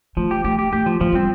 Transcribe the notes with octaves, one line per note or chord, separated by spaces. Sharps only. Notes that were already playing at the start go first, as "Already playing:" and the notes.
F3 A3
G4
A3 G4
G4
A3 G4
F3
F3 A3
G3 C4